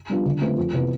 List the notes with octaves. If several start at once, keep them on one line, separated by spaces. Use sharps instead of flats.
G3 B3 D4 F4
D3
A3 C4 F4 B4
F2
C3 E3 B3